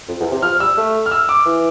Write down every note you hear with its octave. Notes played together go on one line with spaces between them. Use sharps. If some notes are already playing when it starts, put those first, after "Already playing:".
F2
E2
C3
F3 F6
G3 E6
A3
F6
E6
D6
E3